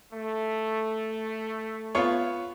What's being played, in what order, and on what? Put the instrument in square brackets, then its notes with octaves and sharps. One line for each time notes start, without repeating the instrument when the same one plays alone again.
[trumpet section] A3
[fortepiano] B3 F4 C#5